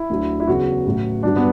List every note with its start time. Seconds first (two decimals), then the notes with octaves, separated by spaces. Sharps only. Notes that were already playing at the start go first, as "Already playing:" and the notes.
Already playing: E4
0.10 D2 D3 F#3
0.40 E4
0.47 E2 C#3 F#3 F#4
0.86 A1 A2 F#3
1.23 G1 G2 F#3 D4
1.36 B3